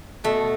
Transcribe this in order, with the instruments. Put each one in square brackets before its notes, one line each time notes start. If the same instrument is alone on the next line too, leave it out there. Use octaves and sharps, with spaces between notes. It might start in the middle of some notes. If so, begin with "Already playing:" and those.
[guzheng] B2 A3